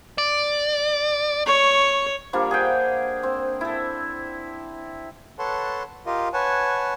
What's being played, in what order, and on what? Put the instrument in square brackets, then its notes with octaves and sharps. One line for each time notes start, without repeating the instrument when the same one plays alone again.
[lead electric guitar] D5
[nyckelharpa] C#5 [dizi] C#6
[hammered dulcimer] F3 G3 A#3 D4
G#4 F#5 G5
C4
E4 A4
[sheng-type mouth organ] A4 B4 C#5 F#5 A5 C6
F4 G4 A#4 D#5 F5
B4 C#5 F#5 G#5 A5